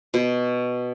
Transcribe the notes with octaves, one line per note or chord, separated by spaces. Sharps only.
B2